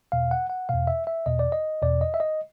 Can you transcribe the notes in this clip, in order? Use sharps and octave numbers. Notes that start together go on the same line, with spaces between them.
E2 B2 F5
F#5
F#5
E2 B2 F5
E5
E5
E2 B2 D#5
D5
D#5
E2 B2 D5
D#5
E5
D#5